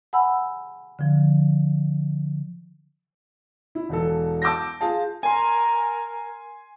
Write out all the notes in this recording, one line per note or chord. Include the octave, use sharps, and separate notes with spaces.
F#5 G#5 B5 E6
D3 F3
E4
E1 E3 A4
A5 D6 E6 G6 A#6
F4 G#4 F5 A5
A#4 G#5 C6